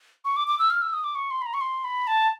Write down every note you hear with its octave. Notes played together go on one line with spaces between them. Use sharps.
C#6
D6
D6
E6
F6
E6
D#6
D6
C#6
C6
B5
A#5
C#6
C6
B5
A5